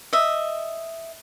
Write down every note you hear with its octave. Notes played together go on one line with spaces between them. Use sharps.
D#5 E5